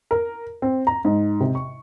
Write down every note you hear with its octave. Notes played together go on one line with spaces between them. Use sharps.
A#4
C4
A#5
G#2
C3
C#6